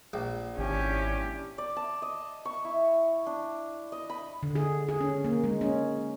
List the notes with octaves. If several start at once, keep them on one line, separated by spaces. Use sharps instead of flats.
A#1
G#1 C#4 D4 E4 G4
D5
A5
D#5
C#6
E4
D4
D#5
B5
D3
G#4
G#4
C#4
A#3
G#3
C#4